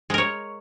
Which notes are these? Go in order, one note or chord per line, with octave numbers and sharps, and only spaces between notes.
G#3 A#4 C#5